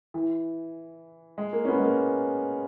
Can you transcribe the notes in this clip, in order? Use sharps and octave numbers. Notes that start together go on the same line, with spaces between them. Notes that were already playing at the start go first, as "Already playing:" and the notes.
E3
G#3
A#3
C#4
B3
G#3
A#3